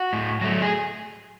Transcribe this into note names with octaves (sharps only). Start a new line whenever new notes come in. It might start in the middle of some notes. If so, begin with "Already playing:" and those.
Already playing: F#4
A2
F#3 A3
G#4